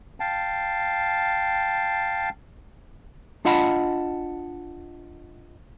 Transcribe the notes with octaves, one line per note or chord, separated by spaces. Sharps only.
F5 G5 A5
D4 F4 D#5 F#5 A5 B5